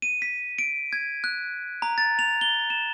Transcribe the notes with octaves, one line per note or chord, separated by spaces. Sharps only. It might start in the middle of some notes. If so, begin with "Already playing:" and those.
D#7
B6
D7
G#6
F#6
A#5
A6
F7
G7
E7